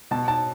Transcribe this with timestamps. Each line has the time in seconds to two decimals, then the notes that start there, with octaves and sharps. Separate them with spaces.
0.11 B2 A5
0.28 A5